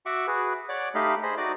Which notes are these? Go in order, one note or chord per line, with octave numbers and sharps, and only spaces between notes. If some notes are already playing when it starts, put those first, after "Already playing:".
F#4 E5 F#5 C#6 D6
F#4 G#4 B4
C#5 D5 F#5 D6
A3 D#4 G4 D#5 F5 B5
G#4 C5 D#5 B5
D#4 F#4 D5 D#5